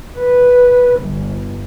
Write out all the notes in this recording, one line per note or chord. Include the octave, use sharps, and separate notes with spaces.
B4
G1